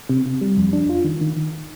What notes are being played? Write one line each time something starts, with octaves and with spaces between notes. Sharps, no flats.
C3
C3
G3
F2
D4
F4
D#3
D#3
D#3